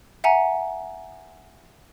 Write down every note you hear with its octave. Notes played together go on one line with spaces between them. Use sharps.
E5 F#5 G#5 A#5